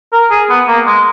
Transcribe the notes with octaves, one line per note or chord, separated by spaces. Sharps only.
A#4
G#4
B3
A#3
G#3